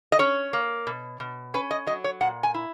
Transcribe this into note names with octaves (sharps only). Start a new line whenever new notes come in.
D#5
C#4 C#5
A#3
B2
B2
C#4 B4
D#5
F#3 D#5
C#5
A#2 F#5
G#5
E4